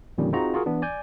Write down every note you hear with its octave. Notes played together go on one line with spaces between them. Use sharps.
F2 A#2 D3 D#3 G3 C#4
C4 D#4 F4 F#4 G#4 A#5
F4 F#4 G#4 A#4
E3 B3 D4
D5 G#5 G6